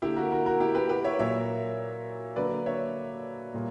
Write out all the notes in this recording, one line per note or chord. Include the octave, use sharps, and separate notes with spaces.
D3 A#3 E4 G4
F#4 A#4
F#4 A#4
F#4 A#4
E4 G4
G4 B4
G4 B4
C#5 E5
A#2 F#3 A#3 C#5 E5
D3 F#3 A#3 B4 D5
C#5 E5
A#2 G3 A#3